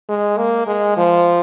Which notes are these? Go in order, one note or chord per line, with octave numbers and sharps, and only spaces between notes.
G#3
A#3
G#3
F3